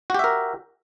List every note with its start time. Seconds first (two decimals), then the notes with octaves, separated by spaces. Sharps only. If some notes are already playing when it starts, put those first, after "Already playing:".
0.10 F#4
0.14 G4
0.19 E5
0.24 A#4